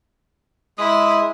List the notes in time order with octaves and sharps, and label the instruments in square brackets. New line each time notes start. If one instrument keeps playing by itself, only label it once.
[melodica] G#3 D#6 [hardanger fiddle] E4